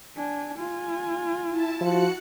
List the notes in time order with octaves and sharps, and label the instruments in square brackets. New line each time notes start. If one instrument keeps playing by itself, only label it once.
[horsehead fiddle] D4 G#5
F4 G#5
[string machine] E4 A5
[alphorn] F3 [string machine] F#4 F#6 C#7